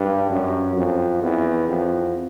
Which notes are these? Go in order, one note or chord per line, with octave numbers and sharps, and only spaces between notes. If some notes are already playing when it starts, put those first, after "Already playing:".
Already playing: G2
F#2
F2
E2
F2